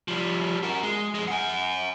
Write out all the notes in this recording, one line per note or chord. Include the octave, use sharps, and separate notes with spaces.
F3 G3
F#4 A#4
G#3
F2 G#3
F#5 G#5